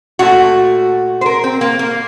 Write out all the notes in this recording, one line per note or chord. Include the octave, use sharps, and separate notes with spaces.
A#2 A3 F#4
C5
A#4
C4
A#3
A#3